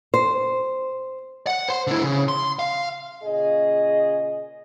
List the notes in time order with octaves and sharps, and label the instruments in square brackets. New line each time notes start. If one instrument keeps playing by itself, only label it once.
[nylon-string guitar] C5
[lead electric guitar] F#5
C5 C6
D3 E4
C#3
C6
F5
[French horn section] A#2 C#3 G#4 D#5